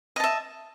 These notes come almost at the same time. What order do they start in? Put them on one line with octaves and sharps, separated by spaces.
D#5 A5 E5